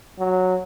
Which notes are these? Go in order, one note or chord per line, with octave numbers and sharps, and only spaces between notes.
F#3